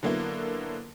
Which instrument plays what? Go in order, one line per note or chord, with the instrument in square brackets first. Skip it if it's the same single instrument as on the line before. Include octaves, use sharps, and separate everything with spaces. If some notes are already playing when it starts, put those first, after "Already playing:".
[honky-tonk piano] D3 F#3 A#3 B3 E4